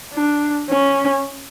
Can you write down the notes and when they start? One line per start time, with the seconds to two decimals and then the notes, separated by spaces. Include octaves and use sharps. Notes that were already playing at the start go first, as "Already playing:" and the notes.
0.13 D4
0.70 C#4